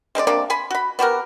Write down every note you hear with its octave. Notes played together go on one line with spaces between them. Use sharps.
G#3 C4 B4 D5
C3 A#3 D4 D5
G#5 B5 C6
F#4 B5
B3 F#4 G4 A#4